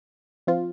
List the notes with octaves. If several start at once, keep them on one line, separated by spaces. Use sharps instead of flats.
F3 C4 F4